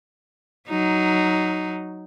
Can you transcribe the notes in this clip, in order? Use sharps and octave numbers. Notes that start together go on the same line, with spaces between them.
F#3 D#4